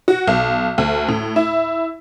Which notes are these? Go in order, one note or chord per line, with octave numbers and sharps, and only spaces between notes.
F#4
B1
D2
A2
E4